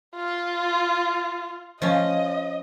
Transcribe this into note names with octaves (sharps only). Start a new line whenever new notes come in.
F4
F3 C#4 D#5